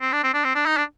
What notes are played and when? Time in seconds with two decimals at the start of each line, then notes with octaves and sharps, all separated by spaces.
0.01 C4
0.12 D4
0.23 C4
0.34 D4
0.44 C4
0.55 D4
0.66 D#4
0.77 D4